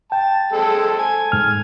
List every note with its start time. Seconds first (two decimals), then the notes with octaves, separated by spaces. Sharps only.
0.12 G5 A5
0.52 G#3 C4 A4
0.99 G#5
1.32 G#2 F6